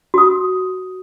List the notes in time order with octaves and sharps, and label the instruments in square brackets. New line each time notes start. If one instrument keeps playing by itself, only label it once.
[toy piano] F#4 D#6